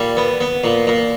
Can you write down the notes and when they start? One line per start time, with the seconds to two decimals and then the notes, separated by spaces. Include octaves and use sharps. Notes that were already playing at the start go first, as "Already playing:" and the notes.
Already playing: A#2 G3
0.17 B3
0.41 B3
0.64 A#2
0.87 A#2